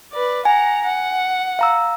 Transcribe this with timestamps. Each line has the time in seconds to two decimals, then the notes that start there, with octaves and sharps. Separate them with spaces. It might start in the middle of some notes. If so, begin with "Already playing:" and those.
0.12 B4 D5
0.45 F#5 G#5 A#5
0.84 F#5
1.59 F5 A#5 E6